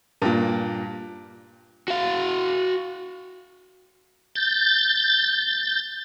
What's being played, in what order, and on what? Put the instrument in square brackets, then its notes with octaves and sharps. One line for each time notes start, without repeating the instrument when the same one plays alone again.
[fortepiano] G2 A#2
[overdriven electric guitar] F#4 F5
[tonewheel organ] G6 A6